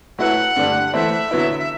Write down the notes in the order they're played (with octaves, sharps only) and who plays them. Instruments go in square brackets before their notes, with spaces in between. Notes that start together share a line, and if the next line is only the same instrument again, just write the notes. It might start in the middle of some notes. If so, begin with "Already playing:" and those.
[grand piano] F#3 A3 E4 B4 [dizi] F#5
[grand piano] G2 D3 A3 D4 G4
[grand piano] E3 A3 E4 A4 C5 [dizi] E5
[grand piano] D3 F#3 B3 E4
[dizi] E5